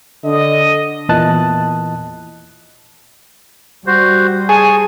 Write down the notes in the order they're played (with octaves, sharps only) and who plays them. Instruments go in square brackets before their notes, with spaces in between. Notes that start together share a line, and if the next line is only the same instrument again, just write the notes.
[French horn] D3 [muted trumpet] D#5
[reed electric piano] E2 A#2 E3 D#5 A5 F#6
[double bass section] G3 [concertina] F#4 C5
[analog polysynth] G#4 [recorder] G#5 [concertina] A5 C#6